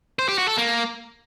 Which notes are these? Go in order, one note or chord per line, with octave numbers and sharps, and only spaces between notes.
C5
G4
F#4
A4
A#3